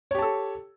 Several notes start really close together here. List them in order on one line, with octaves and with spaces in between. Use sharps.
C#5 G4 A5 A4